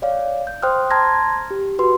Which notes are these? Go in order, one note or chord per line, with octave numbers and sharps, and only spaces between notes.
C#5 D5 F5
G6
C5 G5 C6 D#6 F6 F#6
A5 A#5 C6 F6 G#6 A#6
G4
F#4 B4 C6